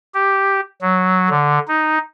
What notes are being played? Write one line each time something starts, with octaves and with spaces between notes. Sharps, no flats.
G4
F#3
D3
D#4